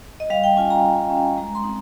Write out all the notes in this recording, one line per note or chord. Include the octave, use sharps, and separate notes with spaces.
D#5
G3 F5
G5
C#4 F4 G#5
A#5
G3
C#4 F4
G#3 A#5
C6
C4 D#4